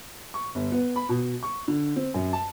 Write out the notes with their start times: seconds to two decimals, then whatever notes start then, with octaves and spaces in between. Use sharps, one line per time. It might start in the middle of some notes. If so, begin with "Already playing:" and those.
0.34 C#6
0.55 G1
0.72 B3
0.96 B5
1.09 B2
1.43 C#6
1.68 D3
1.96 C4
2.14 F#2
2.33 A5